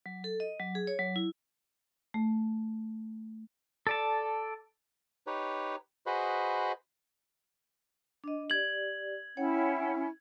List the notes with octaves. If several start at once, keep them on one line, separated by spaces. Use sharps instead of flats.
F#3
A4
D#5
F#3
G#4
C#5
F#3
E4
A3
A4 D5 A5
D#4 G4 B4 C#5
F#4 G#4 B4 C5 D#5 B5
D4 D#5
G4 D5 G#6 F#7
C#4 E4 C#5 F#5 G5